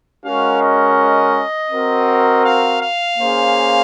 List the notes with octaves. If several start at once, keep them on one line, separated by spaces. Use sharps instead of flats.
G#3 C#4 F#4 A#4 F5
D#5
C4 F#4 A#4
F5
F5
A#3 C#4 G#4 C5